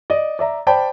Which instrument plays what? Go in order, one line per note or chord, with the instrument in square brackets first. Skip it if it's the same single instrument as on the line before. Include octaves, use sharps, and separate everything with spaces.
[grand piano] D5 D#5
D5 E5 A#5
C5 D5 G5 A5 B5